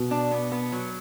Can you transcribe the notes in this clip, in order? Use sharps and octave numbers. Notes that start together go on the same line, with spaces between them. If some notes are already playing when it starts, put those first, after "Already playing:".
Already playing: B2
D4
B3
B3
F#3